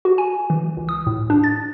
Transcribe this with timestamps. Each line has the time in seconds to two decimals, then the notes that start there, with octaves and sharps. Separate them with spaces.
0.05 F#4
0.18 G#5
0.50 E3
0.77 C#2
0.89 D#6
1.07 A2
1.30 D4
1.44 A6